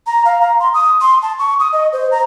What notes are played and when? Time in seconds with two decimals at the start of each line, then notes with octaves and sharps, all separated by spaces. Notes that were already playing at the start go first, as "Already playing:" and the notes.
0.07 A#5
0.25 F5
0.41 A#5
0.60 C6
0.74 D#6
1.01 C6
1.22 A5
1.39 C#6
1.60 D#6
1.73 D#5
1.93 C5
2.11 A#5